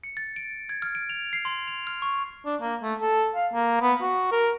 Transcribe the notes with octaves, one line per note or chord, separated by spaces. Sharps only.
C#7
A6
D7
G#6
F6
D7
F7
C7
C6
F7
F6
C#6
D4
A#3
A3
A4
F5
A#3
B3
F#4
A#4